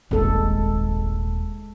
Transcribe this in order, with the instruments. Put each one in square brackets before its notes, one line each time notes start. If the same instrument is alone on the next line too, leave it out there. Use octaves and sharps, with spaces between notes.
[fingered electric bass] D#1 D#2 [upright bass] G#1 [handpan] G#3 A4